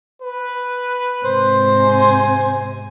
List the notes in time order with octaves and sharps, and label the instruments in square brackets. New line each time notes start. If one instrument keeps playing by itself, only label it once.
[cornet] B4
[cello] G#2 C3 [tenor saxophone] C5
[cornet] G#5